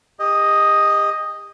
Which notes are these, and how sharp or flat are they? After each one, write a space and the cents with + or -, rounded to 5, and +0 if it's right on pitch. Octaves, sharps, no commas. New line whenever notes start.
G4 +35 D#5 +0